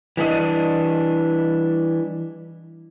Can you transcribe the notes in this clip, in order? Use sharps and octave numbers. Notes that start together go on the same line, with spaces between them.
E3 G3 D4 D#5